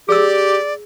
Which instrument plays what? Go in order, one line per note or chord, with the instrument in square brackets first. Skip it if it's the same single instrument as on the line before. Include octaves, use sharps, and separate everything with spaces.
[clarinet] G4 [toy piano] G#4 E6 [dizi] D5